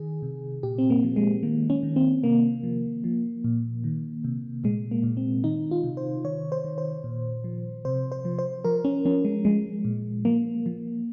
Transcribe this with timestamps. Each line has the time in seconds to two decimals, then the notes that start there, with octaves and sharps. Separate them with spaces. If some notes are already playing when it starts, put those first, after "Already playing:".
Already playing: D#3 G#4
0.23 C3
0.63 A#2 G4
0.78 C4
0.90 A#3
1.04 F3
1.16 G#3
1.43 D#3 A#3
1.70 C#4
1.83 D#3
1.96 C4
2.23 C3 A#3
2.63 F3
3.04 F3
3.44 A#2
3.84 D#3
4.24 C3
4.64 A#2 G#3
4.91 A#3
5.04 A#2
5.17 C4
5.44 D#3 D#4
5.71 F4
5.84 C3
5.97 C5
6.24 D#3 C#5
6.52 C5
6.65 D#3
6.78 C5
7.04 A#2
7.44 F3
7.85 C3 C5
8.12 C5
8.25 F3
8.39 C5
8.64 F3 A#4
8.85 C#4
9.05 F3 C#4
9.25 G#3
9.45 F3 G#3
9.85 A#2
10.25 F3 A#3
10.66 F3